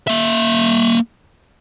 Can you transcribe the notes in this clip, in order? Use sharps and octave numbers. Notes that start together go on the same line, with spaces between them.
A#3 E5